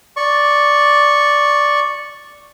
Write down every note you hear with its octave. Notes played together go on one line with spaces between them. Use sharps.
D5 C#6